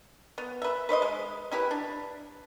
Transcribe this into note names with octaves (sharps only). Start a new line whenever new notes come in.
B3
B4 E5
B4 C5 D5 D#5
G#3
C#4 E4 G4 B4
D4